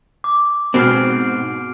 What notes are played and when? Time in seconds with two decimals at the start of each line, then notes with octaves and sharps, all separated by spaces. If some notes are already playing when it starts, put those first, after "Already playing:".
0.24 D6
0.74 G#2 B2 C4 F6 C7 D7